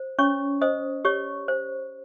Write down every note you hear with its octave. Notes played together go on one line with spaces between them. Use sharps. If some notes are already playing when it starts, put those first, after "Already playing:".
Already playing: C5
C#4 C#5 C#6
C5 D#5 D#6
G4 C#5 C#6
C5